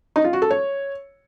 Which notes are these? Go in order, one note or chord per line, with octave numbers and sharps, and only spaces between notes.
D#4
F4
F#4
A4
C#5